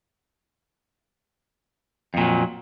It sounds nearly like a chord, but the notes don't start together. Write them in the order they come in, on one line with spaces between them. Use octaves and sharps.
F2 A#2 F#3